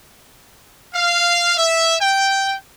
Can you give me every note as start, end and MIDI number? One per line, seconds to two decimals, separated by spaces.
0.94 1.57 77
1.57 1.96 76
2.01 2.54 79